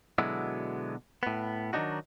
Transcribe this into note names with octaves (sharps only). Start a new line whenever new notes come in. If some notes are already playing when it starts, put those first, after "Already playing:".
B2 D3 F#3 G#3 B3 E4
A2 B3
D#3 F#3 G#3 D4 D#4 F#4